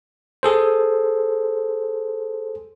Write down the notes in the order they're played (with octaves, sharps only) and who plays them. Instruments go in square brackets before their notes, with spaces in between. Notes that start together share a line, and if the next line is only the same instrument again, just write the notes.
[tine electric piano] G#4 A4 C5